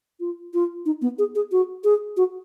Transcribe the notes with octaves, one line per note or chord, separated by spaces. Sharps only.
F4
F4
D#4
B3
G#4
G#4
F#4
G#4
F#4